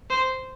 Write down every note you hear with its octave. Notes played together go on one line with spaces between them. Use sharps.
C5